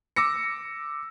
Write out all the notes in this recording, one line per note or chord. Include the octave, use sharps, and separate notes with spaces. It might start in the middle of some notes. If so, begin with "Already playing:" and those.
D6 E6 A#6 C#7